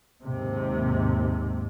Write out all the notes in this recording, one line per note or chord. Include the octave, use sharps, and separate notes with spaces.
D#2 G#2 C3